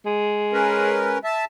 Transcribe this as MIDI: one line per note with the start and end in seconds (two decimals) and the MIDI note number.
0.06 1.21 56
0.53 1.18 61
0.53 1.18 70
0.53 1.18 71
1.24 1.45 76
1.24 1.45 81